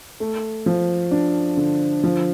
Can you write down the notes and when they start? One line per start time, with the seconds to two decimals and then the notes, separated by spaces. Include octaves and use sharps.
0.20 A3
0.66 F3
1.11 D4
1.57 D3
2.04 F3